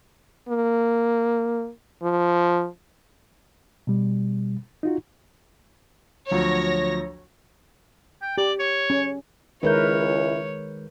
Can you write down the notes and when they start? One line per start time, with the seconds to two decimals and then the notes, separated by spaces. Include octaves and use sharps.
0.49 A#3
2.03 F3
3.87 B2 G3
4.83 D#4 F4 F#4
6.31 D2 F3 F#3 C#5 A#6
8.22 G5
8.38 G4 D5
8.59 C#5
8.90 C#4
9.63 C#2 D#3 G#3 E4 A#4 B4 C#5 G6